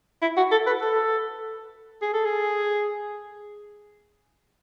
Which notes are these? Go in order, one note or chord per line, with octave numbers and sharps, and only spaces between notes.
E4
F#4
A4
B4
A4
G#4
A4
G#4